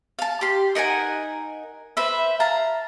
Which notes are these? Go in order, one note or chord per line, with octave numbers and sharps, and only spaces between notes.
F5 A5
G4 C6
D#4 A#4 F#5 G#5
B4 C5 E5
F5 A5 A#5